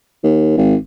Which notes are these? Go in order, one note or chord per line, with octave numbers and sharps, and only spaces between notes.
D#2
G#1